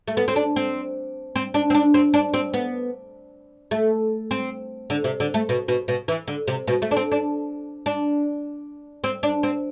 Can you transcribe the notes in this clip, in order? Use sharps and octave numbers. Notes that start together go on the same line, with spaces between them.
A3
B3
C4
D4
C4
C4
D4
C4
D4
C4
D4
C4
B3
A3
C4
D3
C3
D3
A3
B2
B2
B2
E3
D3
C3
B2
A3
D4
C4
D4
D4
C4
D4
C4